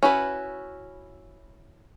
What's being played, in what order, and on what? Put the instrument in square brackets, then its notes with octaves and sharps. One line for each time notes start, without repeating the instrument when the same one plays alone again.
[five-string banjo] C#4 E4 F#4 B4